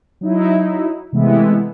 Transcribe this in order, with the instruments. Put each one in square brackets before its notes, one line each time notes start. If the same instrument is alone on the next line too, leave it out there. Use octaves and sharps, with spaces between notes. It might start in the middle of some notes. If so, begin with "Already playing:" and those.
[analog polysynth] F#3 D#4 E4
C3 E3 G#3 A3 B3 E4